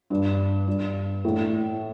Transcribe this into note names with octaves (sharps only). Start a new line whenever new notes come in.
G2
G2
A2